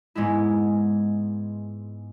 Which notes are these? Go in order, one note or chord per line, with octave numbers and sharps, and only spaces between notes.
G#2 G#3 B3 E4